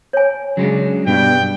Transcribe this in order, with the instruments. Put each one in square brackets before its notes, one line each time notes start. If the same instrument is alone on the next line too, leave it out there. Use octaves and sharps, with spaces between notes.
[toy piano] C#5 G#5
[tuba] C#3 [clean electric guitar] F#3 G#3 D4
[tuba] G2 [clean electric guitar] B2 [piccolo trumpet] G5